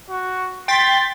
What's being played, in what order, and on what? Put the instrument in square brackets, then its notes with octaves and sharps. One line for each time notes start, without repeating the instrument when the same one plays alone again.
[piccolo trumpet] F#4
[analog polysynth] G5 A6 B6 [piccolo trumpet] C6